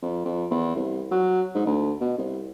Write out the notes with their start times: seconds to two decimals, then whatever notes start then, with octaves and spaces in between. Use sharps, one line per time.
0.02 F2
0.25 F2
0.51 E2
0.76 C2
1.11 F#3
1.55 G#2
1.66 D2
2.01 B2
2.18 C2